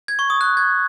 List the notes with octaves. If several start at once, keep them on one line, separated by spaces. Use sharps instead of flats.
G#6
C#6
D#6
F#6
G#6